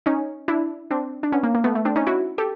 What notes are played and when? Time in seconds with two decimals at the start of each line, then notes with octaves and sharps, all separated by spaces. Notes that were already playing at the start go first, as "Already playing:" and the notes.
0.06 C#4 D#4
0.48 D4 E4
0.91 C4 D4
1.23 D4
1.32 B3 C#4
1.43 A#3
1.55 A#3
1.64 A3 B3
1.75 A3
1.85 C4 D4
1.96 C#4 D#4
2.07 E4 F#4
2.38 G4 A4